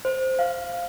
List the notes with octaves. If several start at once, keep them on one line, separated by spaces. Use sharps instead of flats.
C5
F5